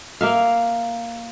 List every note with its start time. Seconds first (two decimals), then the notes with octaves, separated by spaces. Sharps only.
0.21 A#3 E5 F5